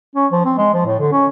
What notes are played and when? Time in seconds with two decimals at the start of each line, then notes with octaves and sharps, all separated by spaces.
0.15 C#4
0.32 F3
0.45 C4
0.58 G#3
0.74 F3
0.86 A2
0.99 D3
1.12 C#4